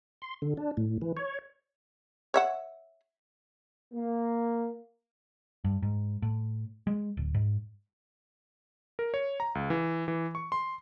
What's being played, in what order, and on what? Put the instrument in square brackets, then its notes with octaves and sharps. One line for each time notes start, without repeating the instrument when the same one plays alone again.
[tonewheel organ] C6
D3
D4
A2
E3
C#5
[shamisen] C#5 E5 F#5
[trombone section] A#3
[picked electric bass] G2
G#2
A2
G#3
D1
G#2
[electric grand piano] A#4
C#5
A#5
C#2
E3
E3
C#6
C6